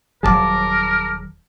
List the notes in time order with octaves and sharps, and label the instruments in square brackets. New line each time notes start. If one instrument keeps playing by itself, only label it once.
[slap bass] D#1 C2 F#3 [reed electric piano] G#4 A5 D6 [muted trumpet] A#4